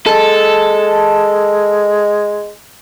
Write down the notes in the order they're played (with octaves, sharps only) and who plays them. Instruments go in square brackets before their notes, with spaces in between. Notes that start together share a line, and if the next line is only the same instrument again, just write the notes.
[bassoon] G#3 [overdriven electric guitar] A4